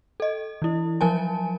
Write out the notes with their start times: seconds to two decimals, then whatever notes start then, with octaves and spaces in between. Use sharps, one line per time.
0.20 A4 D#5
0.62 E3 E4
1.01 F3 F#3 A#4 G#5 A5